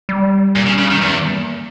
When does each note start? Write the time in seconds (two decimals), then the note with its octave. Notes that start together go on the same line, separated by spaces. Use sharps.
0.09 G3
0.56 A#2
0.66 C#3
0.78 C#3
0.90 D#3
1.01 E2 E3
1.17 G3
1.32 A#3